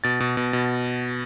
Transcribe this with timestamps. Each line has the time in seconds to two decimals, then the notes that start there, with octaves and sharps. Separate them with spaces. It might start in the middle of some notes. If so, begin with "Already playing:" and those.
0.04 B2 A6
0.20 B2
0.37 B2
0.53 B2